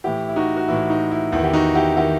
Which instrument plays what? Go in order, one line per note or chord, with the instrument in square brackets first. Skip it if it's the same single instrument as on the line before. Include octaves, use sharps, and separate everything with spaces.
[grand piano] A2 E3 E4 G4
E4
D#4 F#4
F#4
A2 E3 E4
D#4
E4
E2 D#3 E4
G4
D#4 F#4
E4 G4
D#3 E4 G4